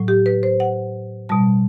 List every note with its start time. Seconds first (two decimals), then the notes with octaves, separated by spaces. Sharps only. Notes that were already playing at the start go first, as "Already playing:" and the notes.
Already playing: A2 F#3
0.08 G4
0.26 B4
0.43 C5
0.60 F#5
1.29 B2 G3 A5